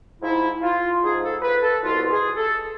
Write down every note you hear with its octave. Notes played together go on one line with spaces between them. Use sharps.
G#2 F3 E4
F4
G#2 F3 G#4
A4
B4
A4
C2 B2 F4
G#4
A4